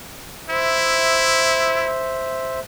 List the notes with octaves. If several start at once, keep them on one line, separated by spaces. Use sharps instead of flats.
E4 C5 E5